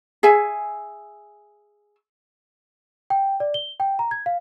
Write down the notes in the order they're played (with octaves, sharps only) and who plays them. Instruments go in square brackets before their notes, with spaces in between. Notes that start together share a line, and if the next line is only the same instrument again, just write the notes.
[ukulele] G#4 E5 G#5
[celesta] G5
D5
G7
G5
A#5
G#6
F5